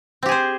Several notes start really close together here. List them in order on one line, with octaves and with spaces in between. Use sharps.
C4 G4 G#4 C5